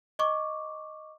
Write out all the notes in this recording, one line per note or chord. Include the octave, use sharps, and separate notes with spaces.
D#5 C#6 D6